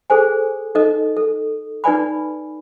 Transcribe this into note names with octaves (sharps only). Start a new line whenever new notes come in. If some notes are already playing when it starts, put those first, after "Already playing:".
G#4 A4 C5 G#5
D#4 A4 D#5
A4
D#4 B4 D5 G#5 B5